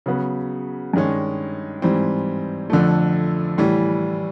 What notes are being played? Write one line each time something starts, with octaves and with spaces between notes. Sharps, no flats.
C#3 F#3 B3
G2 D#3 G#3 C#4
G#2 E3 G3 C4
F2 D3 F3 A3
A2 E3 G3